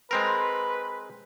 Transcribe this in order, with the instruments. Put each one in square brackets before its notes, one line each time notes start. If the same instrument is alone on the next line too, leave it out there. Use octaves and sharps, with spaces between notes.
[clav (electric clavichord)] G#3 C4 A#4 [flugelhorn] B4